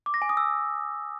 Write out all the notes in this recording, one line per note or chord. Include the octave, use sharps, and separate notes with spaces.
D6
A#6
G#5
D#6
E6